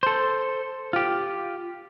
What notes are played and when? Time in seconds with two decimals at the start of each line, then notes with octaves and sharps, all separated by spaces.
0.03 A4 C5
0.93 F4 G4